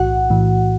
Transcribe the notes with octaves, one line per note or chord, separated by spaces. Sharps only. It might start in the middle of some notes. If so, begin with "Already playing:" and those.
Already playing: B1 A2 E3 F#4 F#5
A2 E3